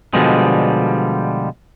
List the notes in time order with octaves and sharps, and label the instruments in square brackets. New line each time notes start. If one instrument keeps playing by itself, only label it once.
[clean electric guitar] B2 D3 F3 G3 G#3